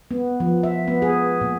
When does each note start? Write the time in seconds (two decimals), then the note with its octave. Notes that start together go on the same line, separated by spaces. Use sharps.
0.11 B3
0.40 F3
0.63 E5
0.88 B3
1.02 G#4
1.41 A#2